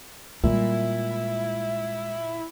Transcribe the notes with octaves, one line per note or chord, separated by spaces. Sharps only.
A#2 G3 G#3 E4